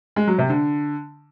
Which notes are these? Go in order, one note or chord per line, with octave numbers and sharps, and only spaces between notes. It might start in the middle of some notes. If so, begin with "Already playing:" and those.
G#3
F#3
C3
D3